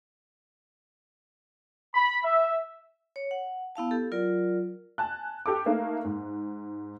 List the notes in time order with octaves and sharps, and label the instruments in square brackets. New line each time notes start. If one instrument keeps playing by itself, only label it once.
[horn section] B5
E5
[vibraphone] C#5
F#5
B3 E4 F5 A5
G4 A4
F#3 F4 A#4 D5
[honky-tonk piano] G#5 A5 F#6
G4 A4 D6
A3 A#3 D#4
G#2